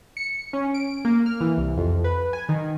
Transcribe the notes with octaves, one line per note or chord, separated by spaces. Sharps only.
C#7
C#4
D7
A#3
F6
E3
C2
F2
B4
G#5
D#3